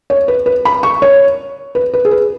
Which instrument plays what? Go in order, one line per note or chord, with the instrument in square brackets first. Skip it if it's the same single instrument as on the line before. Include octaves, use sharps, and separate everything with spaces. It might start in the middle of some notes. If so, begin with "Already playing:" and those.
[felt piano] C#5
B4
B4
B5
C#6
C#5
B4
B4
G#4
B4